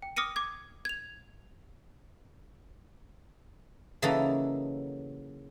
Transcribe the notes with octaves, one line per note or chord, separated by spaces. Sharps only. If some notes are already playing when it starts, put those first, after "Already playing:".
G5
D6 D#6 F6 A#6 C#7 D#7
D6 G#6
G#6 F7
C#3 E3 F#3 A#3 D#4 A4